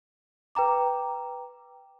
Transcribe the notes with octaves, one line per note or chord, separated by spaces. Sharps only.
B4 G5 A#5 D6